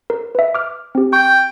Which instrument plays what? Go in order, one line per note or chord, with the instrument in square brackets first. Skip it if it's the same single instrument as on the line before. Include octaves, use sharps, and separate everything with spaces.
[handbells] A#4
B4 E5
D6 F6
C4 G4
[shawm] G5 [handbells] C#6 G6